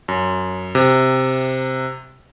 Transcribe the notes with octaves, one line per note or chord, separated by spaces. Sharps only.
F#2
C3